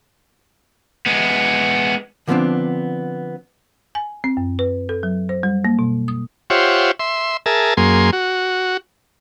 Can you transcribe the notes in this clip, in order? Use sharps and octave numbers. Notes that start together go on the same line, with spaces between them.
G#3 B3
D3 F3 A3 B3 C4 D4
G#5
C4
F#2
B4
A4
F#3
C5
G3
A#3
B2
D#6
F4 G4 C5 C#5 E5 F#5
E5 C6
G#4 A#4 E5 A5
F#2 A#3 G#4 C6
F#4